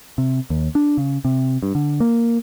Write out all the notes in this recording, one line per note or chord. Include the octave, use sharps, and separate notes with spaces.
C3
D#2
D4
C#3
C3
G2
D3
A#3